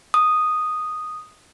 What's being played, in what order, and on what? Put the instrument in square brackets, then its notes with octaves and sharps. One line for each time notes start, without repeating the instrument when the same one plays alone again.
[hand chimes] D#6